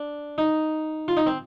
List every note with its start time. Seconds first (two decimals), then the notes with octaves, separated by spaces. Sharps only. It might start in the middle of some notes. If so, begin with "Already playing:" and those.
Already playing: D4
0.38 D#4
1.08 F4
1.17 D#4
1.26 C4